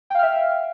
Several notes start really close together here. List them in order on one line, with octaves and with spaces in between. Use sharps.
G5 F5 F6 E5